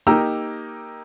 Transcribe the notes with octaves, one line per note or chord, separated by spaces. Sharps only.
A#3 D#4 G4 A#5 E6